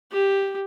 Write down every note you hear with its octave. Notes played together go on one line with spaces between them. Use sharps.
G4